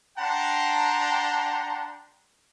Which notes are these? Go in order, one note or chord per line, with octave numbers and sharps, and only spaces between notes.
D4 F#5 G5 A5 A#5 C6